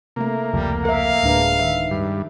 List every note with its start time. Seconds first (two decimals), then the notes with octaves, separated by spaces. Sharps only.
0.16 C3 A3 A#3
0.54 F1 C#2 F3 G3
0.85 A#4 E5 F5
1.23 D1 G#3 D4 B4
1.59 D#3 E5
1.91 G2